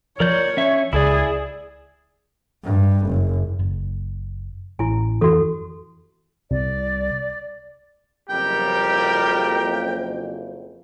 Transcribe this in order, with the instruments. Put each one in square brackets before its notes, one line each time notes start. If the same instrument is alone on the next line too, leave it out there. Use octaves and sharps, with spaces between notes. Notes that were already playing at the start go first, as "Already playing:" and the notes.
[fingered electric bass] F3 [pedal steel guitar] A#4 D5 G6 [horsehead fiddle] C#5
[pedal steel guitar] C#4 E5
[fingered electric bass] C#2 [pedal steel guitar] E4 D5 [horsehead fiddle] G#4
[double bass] G2
F#1
[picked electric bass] F#1
[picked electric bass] A1 [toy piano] E4 G#5
[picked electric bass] F2 E3 B3 [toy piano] F#4 A4
[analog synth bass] C2 [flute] D5
[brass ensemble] F#1 F2 [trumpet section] G3 G4 A#4 [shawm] G5